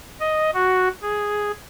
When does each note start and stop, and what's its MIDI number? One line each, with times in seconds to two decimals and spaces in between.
0.20 0.51 75
0.54 0.89 66
1.03 1.52 68